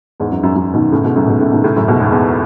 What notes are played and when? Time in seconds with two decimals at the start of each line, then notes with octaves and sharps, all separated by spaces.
0.20 E2 G#2
0.31 F#2
0.43 F#2
0.56 F#2
0.74 B2 D#3
0.92 A2 C#3
1.04 G#2 B2
1.16 F#2 A2
1.27 G#2 B2
1.40 A2 C#3
1.52 B2 D#3
1.64 A2 C#3
1.76 F#2 A2
1.88 G#2 B2
2.00 E2 G#2
2.12 E2